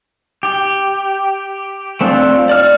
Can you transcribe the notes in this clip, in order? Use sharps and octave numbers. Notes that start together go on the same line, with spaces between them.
G4
A3 C4 D4 F4
D5 F6